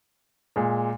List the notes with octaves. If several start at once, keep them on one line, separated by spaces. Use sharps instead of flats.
A#2 G#3